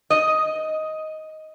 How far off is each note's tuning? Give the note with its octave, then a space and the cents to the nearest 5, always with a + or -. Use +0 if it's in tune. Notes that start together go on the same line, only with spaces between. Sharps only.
D#5 +10